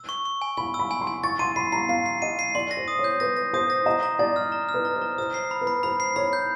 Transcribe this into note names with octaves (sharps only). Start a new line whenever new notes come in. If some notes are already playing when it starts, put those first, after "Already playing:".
Already playing: E6
C#6
C#6
G#5
G#5 B5
E6
B5
G#5
C6
G#5
C#6 A6
C6 D#7
B5 C7
A#5 C7
F5 C7
C7
D#5 D#7
C7
D5 C6
A#6
C5
D#6
C#5
G6
B4 A#6
A#6
C5 D#6
A#6
D#5 A#5
A#5
D5 A6
F6
A#5
F6
B4
A#5
C5
A#5
C5 E6
C7
B5
B4
B5
C5 B5
C7
C#5 B5
G6